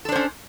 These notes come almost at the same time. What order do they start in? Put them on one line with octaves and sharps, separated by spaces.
A4 D4 C5 C#4